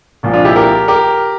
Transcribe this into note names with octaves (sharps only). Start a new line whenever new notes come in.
C2 A#2 F3
D4 F4
E4 G4
G4 A#4
G4 A#4